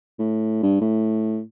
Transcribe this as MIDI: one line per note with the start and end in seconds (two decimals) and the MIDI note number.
0.19 0.61 45
0.63 0.76 43
0.81 1.40 45